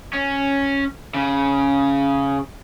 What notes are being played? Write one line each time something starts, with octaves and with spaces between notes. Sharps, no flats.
C#4
C#3